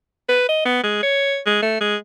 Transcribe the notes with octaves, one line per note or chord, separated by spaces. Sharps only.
B4
D#5
B3
G#3
C#5
G#3
A3
G#3